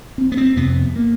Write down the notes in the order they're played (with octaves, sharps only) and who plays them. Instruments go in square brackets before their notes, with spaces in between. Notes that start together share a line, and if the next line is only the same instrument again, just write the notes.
[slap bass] C4
B3
C4
F2 C3 B3
A#3